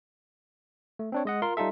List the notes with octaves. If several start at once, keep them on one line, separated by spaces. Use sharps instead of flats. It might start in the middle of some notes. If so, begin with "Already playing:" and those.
A3
C4 D4 C#5
G#3 D#5 F#5
F4 A#4 C6
G3 D#4 F4 A4 E5